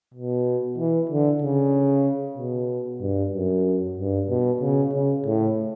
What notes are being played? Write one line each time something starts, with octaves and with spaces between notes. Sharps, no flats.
B2
E3
D3
C#3
B2
G2
F#2
G2
B2
C#3
C#3
A2